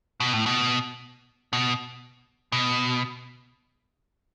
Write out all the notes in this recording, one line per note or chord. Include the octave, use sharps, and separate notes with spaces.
B2
A2
B2
B2
B2